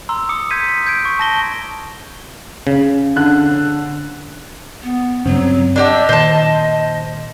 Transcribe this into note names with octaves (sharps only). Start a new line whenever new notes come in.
A#5 C6 E6
C6 D6 D#6 C#7
G6 G#6 B6 D#7
G6 G#6 D7
C#6
A5 A#6 G7
C#3
D3 F#6
B3
G2 C#3 F#3 C4
D4 G4 D5 D#5 F#5 E6
A#2 D#3 C5 A5